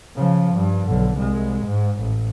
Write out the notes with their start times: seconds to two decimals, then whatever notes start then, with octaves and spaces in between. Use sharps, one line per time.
0.16 C#3 F3
0.55 G2
0.87 B1 D3
1.17 C2 G#3
1.65 G#2
2.01 A1